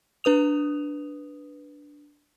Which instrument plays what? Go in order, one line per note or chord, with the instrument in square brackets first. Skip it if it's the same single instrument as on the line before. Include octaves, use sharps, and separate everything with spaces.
[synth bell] D4 B4 D#6 F7